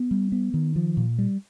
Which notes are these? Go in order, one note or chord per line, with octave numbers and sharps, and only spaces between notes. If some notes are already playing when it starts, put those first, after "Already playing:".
Already playing: B3
G3
B3
D#3
F3
A#2
G3